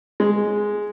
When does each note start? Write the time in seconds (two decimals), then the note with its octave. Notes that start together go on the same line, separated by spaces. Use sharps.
0.20 G#3